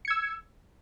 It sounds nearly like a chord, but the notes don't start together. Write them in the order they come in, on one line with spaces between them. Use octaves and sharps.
C#7 G#6 E6